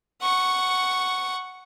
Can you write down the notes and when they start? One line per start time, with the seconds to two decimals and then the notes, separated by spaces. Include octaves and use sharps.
0.22 F#5 C#6